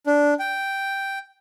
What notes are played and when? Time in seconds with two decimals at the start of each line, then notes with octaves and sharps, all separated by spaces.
0.07 D4
0.39 G5